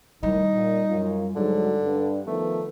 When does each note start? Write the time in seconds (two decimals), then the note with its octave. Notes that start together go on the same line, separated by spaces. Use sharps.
0.23 A2 D#3 G3 D#4
0.54 A#2
0.90 F#2 F4
1.36 G#2 D3 F#3
1.82 G2 D4
2.27 D#3 F3 A3 B3